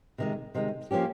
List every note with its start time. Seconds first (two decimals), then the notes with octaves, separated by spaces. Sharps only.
0.18 C3 D#3 G#3
0.55 C3 D#3 G#3
0.91 F3 A#3 C#4 G4